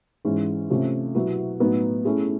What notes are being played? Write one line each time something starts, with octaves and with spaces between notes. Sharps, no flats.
G#2 E3 G#3 C#4
C3 F3 A3 C#4
B2 F#3 B3 E4
A2 F#3 B3 D#4
A3 C#4 E4 G#4